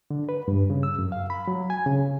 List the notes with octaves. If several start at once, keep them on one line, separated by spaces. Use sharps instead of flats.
D3
B4
G2
C#3
E6
F#2
F5
B5
F#3
G#5
C#3